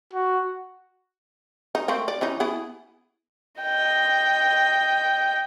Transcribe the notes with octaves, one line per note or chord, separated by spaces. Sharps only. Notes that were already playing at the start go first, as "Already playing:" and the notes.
F#4
D#4
A3 A#3 C4
D5
E3 C#4 D#4
B3 E4 G#4
D#5 G5